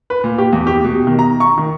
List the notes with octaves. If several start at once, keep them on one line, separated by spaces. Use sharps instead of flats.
B4
A#2
G4
E2
G4
B2
D#3
A#5
C#6
D#3